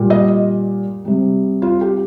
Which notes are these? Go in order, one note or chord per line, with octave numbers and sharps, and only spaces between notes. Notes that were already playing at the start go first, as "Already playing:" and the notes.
Already playing: A#2 G3
D#5
C3 G3
F4
G4